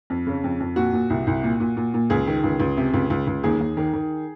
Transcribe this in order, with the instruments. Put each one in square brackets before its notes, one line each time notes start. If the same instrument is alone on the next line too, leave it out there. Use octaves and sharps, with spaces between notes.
[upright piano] F2
C#3
F2
F2
A#2 F#4
A#2
C2
C2
A#2
A#2
A#2
A#2
C#2 G#4
D#3
C#2
C#2
C3
C#2
C#2
C#2
D#2 G#4
D#2
D#3
D#3